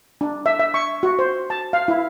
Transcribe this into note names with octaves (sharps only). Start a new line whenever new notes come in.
D4
E5
E5
C#6
F#4
C5
A5
F5
E4